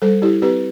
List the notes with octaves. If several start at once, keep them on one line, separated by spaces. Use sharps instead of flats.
G3 A4 C5
E4 G4
C4 G4 B4